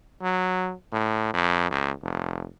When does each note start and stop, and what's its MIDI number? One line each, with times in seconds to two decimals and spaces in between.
0.22 0.73 54
0.92 1.34 45
1.34 1.67 41
1.71 1.91 37
2.03 2.45 29